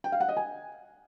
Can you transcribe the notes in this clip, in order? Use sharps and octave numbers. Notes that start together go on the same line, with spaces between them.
G5
F5
F#5
D#5
G#5